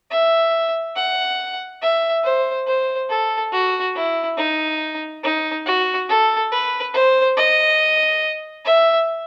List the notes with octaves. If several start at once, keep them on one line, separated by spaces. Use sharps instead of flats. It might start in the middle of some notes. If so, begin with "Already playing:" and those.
E5
F#5
E5
C5
C5
A4
F#4
E4
D#4
D#4
F#4
A4
B4
C5
D#5
E5